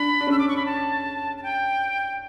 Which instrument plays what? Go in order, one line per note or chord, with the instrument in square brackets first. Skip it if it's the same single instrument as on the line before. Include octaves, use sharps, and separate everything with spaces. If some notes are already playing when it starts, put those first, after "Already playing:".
Already playing: [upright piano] D4 [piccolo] B5
[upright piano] D4
[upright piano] C#4 [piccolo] E6
[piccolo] D6
C#6
B5
A5
A5
G5